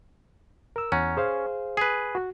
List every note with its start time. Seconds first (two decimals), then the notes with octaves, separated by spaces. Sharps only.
0.76 A#4 E6
0.92 E2 C#4 F#5 A#5
1.17 G#4 C5 F5
1.77 G#4 B4
2.15 F#4